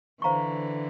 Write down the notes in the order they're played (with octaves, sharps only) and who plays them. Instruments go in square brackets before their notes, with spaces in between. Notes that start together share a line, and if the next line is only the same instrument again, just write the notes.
[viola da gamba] D3 E3 [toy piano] C5 F5 A#5 C#6